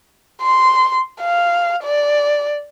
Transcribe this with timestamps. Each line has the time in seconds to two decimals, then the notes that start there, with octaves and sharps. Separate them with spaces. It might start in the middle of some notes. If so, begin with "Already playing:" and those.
0.43 C6
1.21 F5
1.83 D5